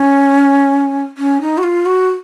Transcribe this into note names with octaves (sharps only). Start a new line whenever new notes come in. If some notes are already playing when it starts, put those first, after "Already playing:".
Already playing: C#4
C#4
D#4
F#4
F4
F#4